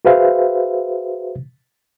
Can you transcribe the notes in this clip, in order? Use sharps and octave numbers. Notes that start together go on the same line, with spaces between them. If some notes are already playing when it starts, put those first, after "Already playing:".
F#4 G#4 B4 C5 E5 F5